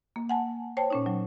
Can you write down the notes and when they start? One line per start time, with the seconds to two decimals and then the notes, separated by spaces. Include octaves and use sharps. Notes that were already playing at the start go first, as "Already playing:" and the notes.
0.16 A#3
0.29 F#5 G#5 A5
0.77 C5 C#5 G5 A5
0.90 A#2 C#4 D#4
1.06 F#3